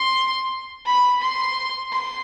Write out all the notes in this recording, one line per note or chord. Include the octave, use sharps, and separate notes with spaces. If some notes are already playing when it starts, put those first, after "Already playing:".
Already playing: C6
B5
C6
C6